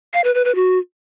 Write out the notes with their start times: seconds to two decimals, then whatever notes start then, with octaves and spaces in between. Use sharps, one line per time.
0.14 F5
0.24 B4
0.34 B4
0.45 B4
0.55 F#4